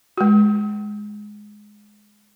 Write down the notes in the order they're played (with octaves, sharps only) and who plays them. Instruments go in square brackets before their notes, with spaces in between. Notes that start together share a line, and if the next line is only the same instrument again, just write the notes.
[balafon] G#3 F#4